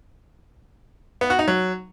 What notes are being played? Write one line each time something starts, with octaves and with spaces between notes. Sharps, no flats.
B3
F#4
D#4
F#3